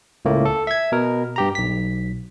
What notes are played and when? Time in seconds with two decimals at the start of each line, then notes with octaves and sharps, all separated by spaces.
0.25 C#2 A2 A3 A#3
0.45 A4
0.67 E5 G#6
0.92 B2 A#4
1.36 G2 G4 A#5
1.55 B1 B6